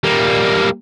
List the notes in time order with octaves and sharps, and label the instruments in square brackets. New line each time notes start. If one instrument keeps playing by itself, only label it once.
[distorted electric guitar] G3 A#3